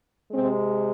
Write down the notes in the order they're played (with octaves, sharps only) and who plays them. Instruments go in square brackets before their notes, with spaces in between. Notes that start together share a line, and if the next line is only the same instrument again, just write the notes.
[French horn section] C3 G#3 C4